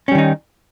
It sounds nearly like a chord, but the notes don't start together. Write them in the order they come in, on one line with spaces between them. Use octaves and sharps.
C#4 G3 D#3 D#4